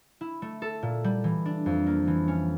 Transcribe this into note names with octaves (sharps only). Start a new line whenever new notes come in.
E4
A3
A4
A#2
G3
E3
D4
F2
A#3
E3
C#4